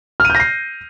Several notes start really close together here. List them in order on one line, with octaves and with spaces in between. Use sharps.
F6 D#7 G6 A#6 C7